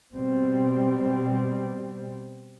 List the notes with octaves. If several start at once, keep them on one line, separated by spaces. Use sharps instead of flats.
B2 G3 C4